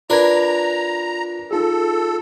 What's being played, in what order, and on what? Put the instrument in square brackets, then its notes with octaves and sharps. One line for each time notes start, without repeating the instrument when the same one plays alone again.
[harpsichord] D4 A#4 B4 [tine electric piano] F4 G#6 [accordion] A#5
[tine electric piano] D#4 F4 G#4 [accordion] A4